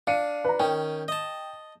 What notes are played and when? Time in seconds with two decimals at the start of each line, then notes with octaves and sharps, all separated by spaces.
0.07 D4 F5 C#7 D#7
0.44 B4 A#5
0.60 D#3 C#4 G5
1.08 D#5 A5